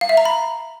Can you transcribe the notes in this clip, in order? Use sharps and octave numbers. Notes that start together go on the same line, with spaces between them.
F5
E5
A#5
B5